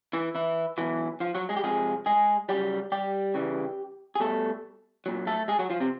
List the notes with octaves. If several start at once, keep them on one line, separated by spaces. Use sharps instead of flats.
E3 E4
E3 E4
B2 E3 F#3 E4
F3 F4
F#3 F#4
G#3 G#4
G4
C3 F3 G#3 G#4
G#3 G#4
C#3 F#3 G3 G4
G3 G4
C#3 E3 G3
G#4
B2 G3 A3 A4
A#2 F#3
A3 A4
G#3 G#4
F#3 F#4
F3 F4
C3 C4